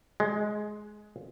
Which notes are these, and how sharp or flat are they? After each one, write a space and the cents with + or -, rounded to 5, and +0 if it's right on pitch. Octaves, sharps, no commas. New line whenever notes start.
G#3 +15